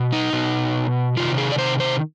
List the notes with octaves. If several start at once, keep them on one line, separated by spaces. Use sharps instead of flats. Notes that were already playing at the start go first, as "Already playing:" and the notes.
Already playing: B2
D#4
B2
C3 D#3 F4
G#4
D5
C5
C5